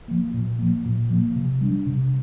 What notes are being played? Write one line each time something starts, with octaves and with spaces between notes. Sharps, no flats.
F3 A#3
A#2
F3 A#3
A#2
F3 A#3
C3
G3 D4
C3